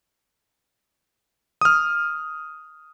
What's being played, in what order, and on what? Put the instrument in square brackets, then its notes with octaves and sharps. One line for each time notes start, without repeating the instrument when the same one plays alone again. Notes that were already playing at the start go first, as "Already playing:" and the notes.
[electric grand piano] D#6 F6